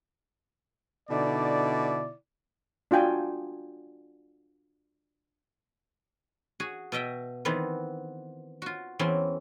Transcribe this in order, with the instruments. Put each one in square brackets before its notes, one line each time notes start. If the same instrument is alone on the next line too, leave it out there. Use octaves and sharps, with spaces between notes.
[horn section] B2 D3 D#4 E4 D5
[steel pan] D4 F4 F#4 G5 G#5
[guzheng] F#4 G#4
B2 D#5 E5 G5
D#3 E3 B3 C4
F4 F#4
E2 E3 C4 C#4 C6